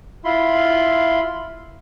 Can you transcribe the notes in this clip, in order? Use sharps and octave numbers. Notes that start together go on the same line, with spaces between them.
E4 F4 B5 C6